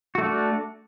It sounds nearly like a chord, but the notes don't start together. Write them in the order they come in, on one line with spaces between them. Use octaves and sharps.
F#4 A3 D4